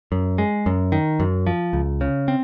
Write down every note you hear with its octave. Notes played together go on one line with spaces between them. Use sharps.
F#2
G#3
F#2
D#3
F#2
F3
C#2
C#3
C4